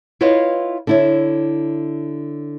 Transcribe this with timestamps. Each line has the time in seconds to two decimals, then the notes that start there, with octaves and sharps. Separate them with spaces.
0.21 E4 F4 B4 C#5 D#5 F5
0.87 D3 E4 C#5